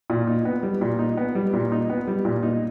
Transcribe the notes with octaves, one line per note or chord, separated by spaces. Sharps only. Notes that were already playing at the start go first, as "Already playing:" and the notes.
A#2
D#4
B3
G3
A#2
D#4
B3
G3
A#2
D#4
B3
G3
A#2
D#4